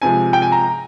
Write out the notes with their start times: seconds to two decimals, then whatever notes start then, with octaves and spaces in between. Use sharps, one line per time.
0.02 C3 F3 G#3 G#5
0.33 G5
0.42 G#5
0.52 A#5